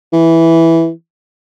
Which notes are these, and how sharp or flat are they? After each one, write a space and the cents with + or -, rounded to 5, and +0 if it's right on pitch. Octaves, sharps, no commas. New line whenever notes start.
E3 -5